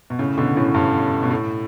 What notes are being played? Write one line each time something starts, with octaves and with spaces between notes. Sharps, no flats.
B2
A2 C#3
B2 D3
A2 C#3
G2
B2
A2